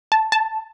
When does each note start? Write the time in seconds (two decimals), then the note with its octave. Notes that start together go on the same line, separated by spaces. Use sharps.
0.12 A5
0.32 A5